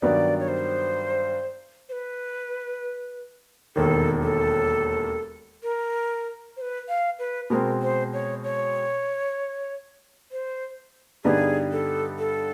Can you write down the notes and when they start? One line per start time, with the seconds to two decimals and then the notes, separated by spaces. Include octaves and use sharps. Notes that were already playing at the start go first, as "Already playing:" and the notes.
0.02 G2 D#3 F#3 B3 D5
0.40 C#5
0.48 C5
1.89 C5
1.92 B4
3.76 E1 D#2 D#3 A4
4.23 A4
5.63 A#4
6.57 C5
6.62 B4
6.88 F5
7.19 B4
7.50 B2 G#3 C4 A#4
7.82 C5
8.13 C#5
8.43 C#5
10.32 C5
11.24 G2 D3 G3 B3 D#4 G#4
11.72 A4
12.19 A4